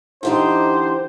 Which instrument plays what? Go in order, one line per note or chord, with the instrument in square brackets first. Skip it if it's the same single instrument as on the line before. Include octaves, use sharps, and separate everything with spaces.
[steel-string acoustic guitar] D3 E3 G4 [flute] D#4 [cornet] C5